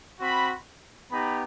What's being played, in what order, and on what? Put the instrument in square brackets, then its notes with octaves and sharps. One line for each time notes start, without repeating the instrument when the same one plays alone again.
[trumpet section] C4 F#4 B5
B3 D#4 G4 B5